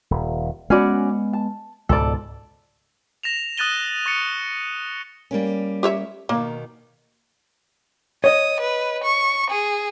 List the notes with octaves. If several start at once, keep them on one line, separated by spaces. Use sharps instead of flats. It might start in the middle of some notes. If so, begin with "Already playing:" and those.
D#1
G#3 B3 C#4 F#4 D5
A5
C#2 G#2 B2 A4 D5
A#6 E7 F7
D#6 F#6 A6 D#7 G7
C#6 A6 C#7
G3 A#3 C#4
G4 C#5 E5
B2 D#3 A#3
C#5 D#5 D#6
B4
C#6
G#4